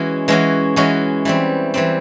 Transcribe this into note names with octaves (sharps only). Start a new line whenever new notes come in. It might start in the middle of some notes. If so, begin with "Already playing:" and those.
Already playing: E3 G#3 C#4 F#4
E3 G#3 C#4 F#4
E3 G#3 C#4 F#4
E3 G3 C4
E3 G3 C4